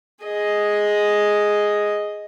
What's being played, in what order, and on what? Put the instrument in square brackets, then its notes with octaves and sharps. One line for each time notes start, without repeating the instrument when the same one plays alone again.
[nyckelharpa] G#4 D#5